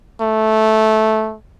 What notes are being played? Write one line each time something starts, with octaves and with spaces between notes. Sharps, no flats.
A3